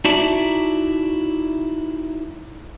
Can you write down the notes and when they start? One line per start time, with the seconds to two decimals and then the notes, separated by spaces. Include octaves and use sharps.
0.05 D#4 E4 F#4 D5 E5 A5